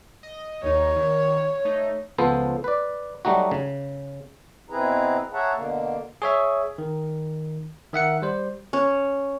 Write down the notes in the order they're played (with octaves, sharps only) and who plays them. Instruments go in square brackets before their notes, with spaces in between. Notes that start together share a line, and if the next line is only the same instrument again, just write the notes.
[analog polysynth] D#5
[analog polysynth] D#2 D#4 [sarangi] C#5
[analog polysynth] D#3
A3 D#4
[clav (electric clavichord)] C#2 F3 B3 A4 C5
B4 D5
F#3 G3 A3 D#4 F#4
C#3
[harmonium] B2 C4 E4 G#4 B4 A#5
G#4 C#5 E5 F#5 A5 A#5
B2 D3 A#3
[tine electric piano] G#4 C#5 E5
D#3
D#3 E5 F#5 C#7
G3 C5
[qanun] C#4